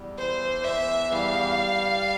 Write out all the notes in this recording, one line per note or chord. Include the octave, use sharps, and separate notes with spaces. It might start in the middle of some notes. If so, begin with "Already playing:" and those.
Already playing: E2 G3
E3 C5
E2 E5
G3 F5